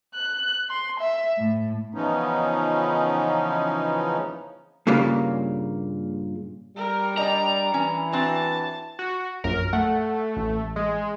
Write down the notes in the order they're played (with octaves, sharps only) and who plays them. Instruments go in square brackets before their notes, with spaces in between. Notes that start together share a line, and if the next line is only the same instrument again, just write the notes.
[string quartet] F#6
C6
E5
A2
[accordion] C#3 E3 F3 B3 C#4 D#4
[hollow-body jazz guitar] G2 A#2 C#3 A#3
[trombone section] G3 [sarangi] A#4
[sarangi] D4 [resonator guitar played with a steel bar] D#5 G5 [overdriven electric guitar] A#5
[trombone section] E3 [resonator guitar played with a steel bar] C#4
[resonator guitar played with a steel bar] C4 D4 F#4 [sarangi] A5
[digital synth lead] F#4
[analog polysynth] A#1 F#2 [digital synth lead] A#4
[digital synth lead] A3 [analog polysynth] F#5
[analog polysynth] A1
[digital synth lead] G#3